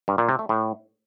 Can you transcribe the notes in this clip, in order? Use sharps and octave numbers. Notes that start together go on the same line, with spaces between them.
G2
A#2
C3
A3
A2